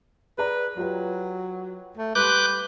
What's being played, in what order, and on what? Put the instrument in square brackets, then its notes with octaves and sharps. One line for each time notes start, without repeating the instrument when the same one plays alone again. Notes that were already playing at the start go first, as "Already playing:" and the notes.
[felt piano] G#4 D5 A#5 [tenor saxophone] B4
[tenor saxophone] F#3 [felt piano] F4 G4 B4
[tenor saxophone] A3
[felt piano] G3 C6 [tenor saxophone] B4 [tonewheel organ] D6 F#6 G6